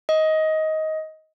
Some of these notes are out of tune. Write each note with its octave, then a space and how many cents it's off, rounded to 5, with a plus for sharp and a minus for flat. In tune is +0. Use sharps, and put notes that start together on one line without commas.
D#5 +15